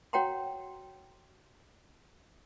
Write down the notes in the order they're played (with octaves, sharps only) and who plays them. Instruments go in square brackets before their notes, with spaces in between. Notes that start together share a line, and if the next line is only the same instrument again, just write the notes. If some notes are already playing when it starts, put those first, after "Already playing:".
[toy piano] F#4 C#5 F#5 G5 A#5 C6